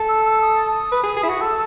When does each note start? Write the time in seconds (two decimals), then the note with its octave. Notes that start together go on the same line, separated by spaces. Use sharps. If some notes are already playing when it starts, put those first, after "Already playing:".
Already playing: A4
0.09 E6
0.25 E6
0.42 D#6
0.92 B4
1.04 G#4
1.17 G#4
1.23 E4
1.29 F#4
1.41 A4 E6